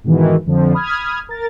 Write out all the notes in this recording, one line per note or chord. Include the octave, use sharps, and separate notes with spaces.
G#2 B2 D#3 E3
F2 D3 F3
B5 D#6 F6 G#6
A#4 A6